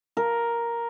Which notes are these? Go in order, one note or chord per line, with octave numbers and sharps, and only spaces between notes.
A#4